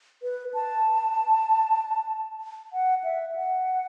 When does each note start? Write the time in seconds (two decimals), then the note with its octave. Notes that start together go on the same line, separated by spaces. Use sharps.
0.23 B4
0.54 A5
2.73 F#5
3.04 E5
3.35 F#5